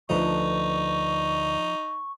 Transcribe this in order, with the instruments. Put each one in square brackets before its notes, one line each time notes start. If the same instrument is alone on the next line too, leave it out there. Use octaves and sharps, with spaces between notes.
[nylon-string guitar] D2 B4 [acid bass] F3 [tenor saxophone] D#4 [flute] C#6